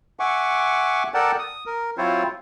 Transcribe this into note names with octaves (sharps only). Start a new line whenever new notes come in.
E5 F#5 G#5 C#6 D6
A4 A#4 D5 F#5 G5 A5
D#6
A#4
F#3 C4 E4 F4 C5 C#5